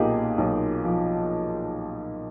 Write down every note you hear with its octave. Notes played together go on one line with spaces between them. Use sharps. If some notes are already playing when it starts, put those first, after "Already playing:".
Already playing: B1 A#2 D#4 G4 G#4
B1
F3